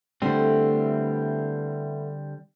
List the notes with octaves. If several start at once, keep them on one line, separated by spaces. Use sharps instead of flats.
D3 G3 A3 B3 C4 E4